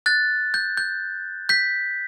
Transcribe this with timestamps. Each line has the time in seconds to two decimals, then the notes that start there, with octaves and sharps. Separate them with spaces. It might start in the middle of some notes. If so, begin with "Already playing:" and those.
0.06 F#6 A6
0.54 G6
0.77 G6
1.49 G6 B6